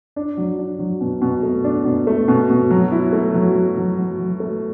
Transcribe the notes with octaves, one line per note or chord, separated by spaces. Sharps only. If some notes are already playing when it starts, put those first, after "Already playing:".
D4
F#3
D4
F#3
B2
B2
A3
D4
B2
A3
B2
B2
F#3
E4
A3
F#3
F#3
F#3
F#3
F#3
A3